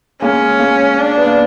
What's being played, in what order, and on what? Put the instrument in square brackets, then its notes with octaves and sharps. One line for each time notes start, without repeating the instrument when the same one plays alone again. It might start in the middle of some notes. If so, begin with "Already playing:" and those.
[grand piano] G#3 A#3 [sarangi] C#4
[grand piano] G#3 A#3
[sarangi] D4
[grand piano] B3
A#3